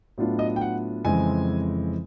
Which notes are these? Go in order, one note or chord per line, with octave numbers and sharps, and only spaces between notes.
A2 F#3 B3 D4 F4
D#5
G5
F#5
F2 C#3 E3 G#3 C4 G#5